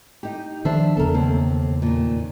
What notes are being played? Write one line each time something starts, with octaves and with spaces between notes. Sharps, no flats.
D#4 G4
D#3 F3 D4 C5 E5
E2 C#3 B3 A4 A#4
D#2 C4
A#2 D#3